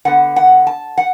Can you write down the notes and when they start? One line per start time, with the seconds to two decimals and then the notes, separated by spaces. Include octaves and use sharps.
0.05 D3 B3 F#5
0.36 F#5
0.67 A5
0.97 F#5